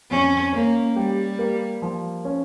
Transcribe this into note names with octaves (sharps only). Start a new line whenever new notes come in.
F2 C#4
A#3 C#4
G3 G4
A#3
F3
C#4